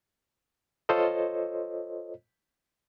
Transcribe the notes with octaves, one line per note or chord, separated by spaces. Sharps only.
F4 A4 C5 C#5 D#5